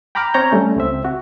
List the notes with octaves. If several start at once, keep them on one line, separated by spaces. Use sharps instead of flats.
G5 A#5 B5 D6 F6
C4 C#5 A#5 G6
G3 A3 C#4
C#2 C4 E5
F#4